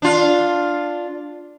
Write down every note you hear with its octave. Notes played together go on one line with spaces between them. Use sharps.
D4 F4